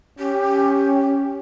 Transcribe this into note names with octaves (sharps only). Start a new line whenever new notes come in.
C#4 G4